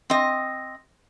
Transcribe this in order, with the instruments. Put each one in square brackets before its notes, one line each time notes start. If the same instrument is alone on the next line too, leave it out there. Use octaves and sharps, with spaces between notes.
[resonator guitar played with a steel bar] C4 D#5